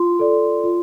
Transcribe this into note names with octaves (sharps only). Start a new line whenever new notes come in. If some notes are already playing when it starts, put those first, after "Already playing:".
Already playing: F4 C6
A4 D5
F4